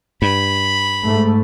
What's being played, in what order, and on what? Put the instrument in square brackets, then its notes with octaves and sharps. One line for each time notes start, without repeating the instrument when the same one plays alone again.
[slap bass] G2 [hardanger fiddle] B5
[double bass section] G#2 A3